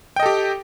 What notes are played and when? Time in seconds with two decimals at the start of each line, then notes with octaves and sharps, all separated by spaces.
0.16 G5
0.20 D#5
0.23 A4
0.26 G4